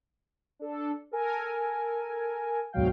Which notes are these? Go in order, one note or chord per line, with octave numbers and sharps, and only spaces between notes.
D4 A4
A4 A#4 G#5
D2 G#2 B2 F#3 F5 G5